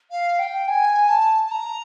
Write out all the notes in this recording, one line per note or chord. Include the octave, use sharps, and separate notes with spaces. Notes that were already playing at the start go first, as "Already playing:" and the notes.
F5
G5
G#5
A5
A5
A#5